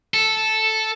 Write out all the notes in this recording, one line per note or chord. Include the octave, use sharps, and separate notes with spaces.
A4